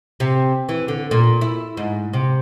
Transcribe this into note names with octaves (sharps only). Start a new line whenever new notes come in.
C3
E3
D3
A#2
E4
G#2
C3